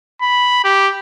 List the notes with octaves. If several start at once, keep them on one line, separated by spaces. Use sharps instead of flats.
B5
G4